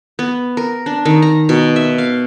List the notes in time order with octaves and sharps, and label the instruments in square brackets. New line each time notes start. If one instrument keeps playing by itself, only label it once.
[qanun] B3
A#4
D4
D#3
A#5
B2
E5
F5